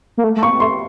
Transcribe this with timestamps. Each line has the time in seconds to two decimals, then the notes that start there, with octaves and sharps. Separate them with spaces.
0.18 A#3
0.24 A3
0.37 A3
0.42 A#3 C#6
0.60 A3 C6